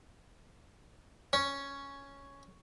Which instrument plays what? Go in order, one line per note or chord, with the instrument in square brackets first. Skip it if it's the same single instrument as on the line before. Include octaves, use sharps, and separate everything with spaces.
[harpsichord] C#4